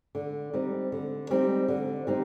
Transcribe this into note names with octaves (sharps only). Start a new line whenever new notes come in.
D3
G3 C4 D#4
D3
G3 C4 D#4
D3
G3 C4 D#4